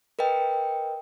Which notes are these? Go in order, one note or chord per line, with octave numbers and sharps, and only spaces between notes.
A#4 B4 D#5 G5